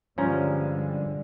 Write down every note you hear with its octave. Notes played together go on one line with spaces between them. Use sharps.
G2 D3 F3 G3 G#3 C#4 A#5